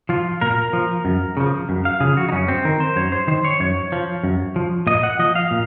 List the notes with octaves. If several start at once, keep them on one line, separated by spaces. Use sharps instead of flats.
F3 F4
A#2 A#4
F3
F#2
C#3 F3
F#2
F5
C#3 F3 G#4
F#4
D#4
F#2 C#4
C4
D#3 A#4
C5
F#2 C#5
C5
D#3 C5
C#5
F#2 C#5
F3
F#2
F3
A#2 D#5
F#5
F3 D#5
F5
A#2